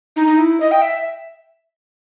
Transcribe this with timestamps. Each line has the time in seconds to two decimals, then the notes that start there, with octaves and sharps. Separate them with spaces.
0.16 D#4
0.27 D#4
0.38 E4
0.60 D#5
0.71 G5
0.82 E5